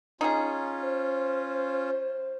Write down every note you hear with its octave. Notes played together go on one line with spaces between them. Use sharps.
C#4 D#4 F4 G#4
C5